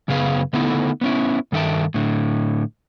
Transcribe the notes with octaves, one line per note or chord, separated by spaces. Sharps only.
F#2 C#3 B3 G#4 B4 F5
D3 A3 B3 D#4 E4 A4
B3 C#4 E4
G2 D#3 A4 E5 G5 A5
A2 D3